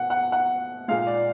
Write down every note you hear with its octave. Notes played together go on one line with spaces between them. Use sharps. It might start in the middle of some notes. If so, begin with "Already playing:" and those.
Already playing: B2 F#5
F#5
F#5
A#2 G#3 F5
D5